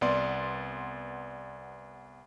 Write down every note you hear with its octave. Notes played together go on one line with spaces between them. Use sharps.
C2 B3 D5 C6